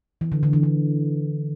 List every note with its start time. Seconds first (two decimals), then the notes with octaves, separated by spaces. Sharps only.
0.21 E3
0.32 D3
0.43 D3
0.53 E3
0.63 D3